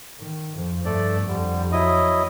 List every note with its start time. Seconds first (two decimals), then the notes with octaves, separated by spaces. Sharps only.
0.19 D#3
0.55 F2 F3
0.85 G2 A3 A4 D5
1.27 F2 D3 G3
1.72 F#3 E4 D#5